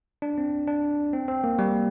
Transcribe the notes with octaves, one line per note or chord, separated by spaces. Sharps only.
D4
C4
D4
C4
C4
A#3
G3